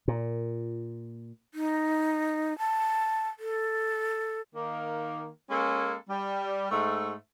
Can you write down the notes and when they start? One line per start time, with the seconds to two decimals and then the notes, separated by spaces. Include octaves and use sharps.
0.08 A#2
1.54 D#4
2.59 A5
3.39 A4
4.54 D#3 A#3
5.50 G#3 A#3 C#4 A4
6.09 G3
6.70 G#2 A3